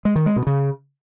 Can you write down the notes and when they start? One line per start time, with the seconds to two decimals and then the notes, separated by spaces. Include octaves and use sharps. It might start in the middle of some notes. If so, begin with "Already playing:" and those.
0.05 G#3
0.16 D#3
0.26 G#3
0.36 B2
0.47 C#3